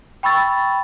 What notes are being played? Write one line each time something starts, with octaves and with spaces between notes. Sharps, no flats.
G5 B5 C#6 E6 A6